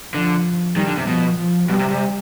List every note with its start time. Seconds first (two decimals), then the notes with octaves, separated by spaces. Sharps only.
0.14 D3 F3
0.76 D#3 G3
0.87 D3
0.97 C3
1.07 B2 F3
1.38 F3
1.69 B2 G3
1.79 C3
1.90 C3